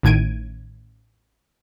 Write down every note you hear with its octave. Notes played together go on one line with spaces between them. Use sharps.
A1 A2 D#3 G#6 D7 D#7